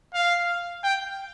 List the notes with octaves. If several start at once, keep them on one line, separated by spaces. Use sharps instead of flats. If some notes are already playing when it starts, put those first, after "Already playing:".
F5
G5